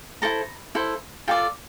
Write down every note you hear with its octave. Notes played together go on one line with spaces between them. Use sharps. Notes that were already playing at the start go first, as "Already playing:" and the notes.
E4 A4 C5 A#5
E4 A4 C5
F4 A4 D5 G5